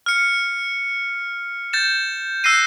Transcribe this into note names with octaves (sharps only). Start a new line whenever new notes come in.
F6 C#7
G6 A6 E7
E6 F#6 A#6 C7 D#7